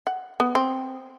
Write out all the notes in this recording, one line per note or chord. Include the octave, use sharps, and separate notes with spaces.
F#5
B3
C4